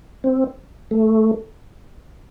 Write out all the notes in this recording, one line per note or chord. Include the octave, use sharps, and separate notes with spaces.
C4
A3